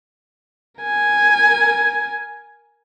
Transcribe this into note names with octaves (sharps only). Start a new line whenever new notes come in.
A#4 G#5